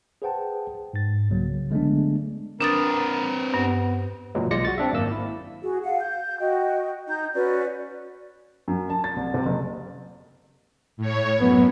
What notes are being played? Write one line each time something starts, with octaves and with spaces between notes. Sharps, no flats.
G#4 B4 C5 F#5 G5 A5
G#2 A6
C2 C#3 F#3 A#3
D3 G#3 A3 B3 D4
C4 D4 A#4 B4 D#6 A6
G2 B3
F#2 A#2 C#3 E3 F#3 G#3
B1 G#3 F4 D5 A#6 C#7
F#4 A6
C4 D4 E5
G#1 F#2 A#3 E6
E4
F#4 G#4
F5 F#5
G6
F#4 D#5 G5
D#4 G6
C#4 F#4 B4 D5
F#2
A5
A6
C2
C3
F#1
A2 C#5
F#2 B3